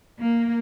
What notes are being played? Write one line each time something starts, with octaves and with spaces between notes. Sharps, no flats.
A#3